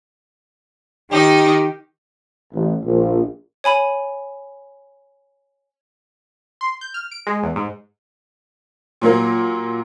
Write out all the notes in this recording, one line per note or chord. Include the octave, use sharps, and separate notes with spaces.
D#3 D#4 G4
A1
A#1
C#5 G#5 B5 D#7
C6
G6
F6
D7
G#3
E2
G#2
A#2 F#3 A#3 A#4